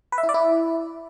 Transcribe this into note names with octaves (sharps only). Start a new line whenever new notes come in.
B4
E5
E4
D5
E4